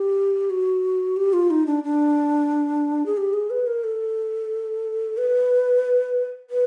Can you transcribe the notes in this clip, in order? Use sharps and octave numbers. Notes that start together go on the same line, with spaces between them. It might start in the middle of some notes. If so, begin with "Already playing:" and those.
Already playing: G4
F#4
G4
F4
D#4
D4
D4
G#4
G4
G#4
B4
A#4
A4
B4
B4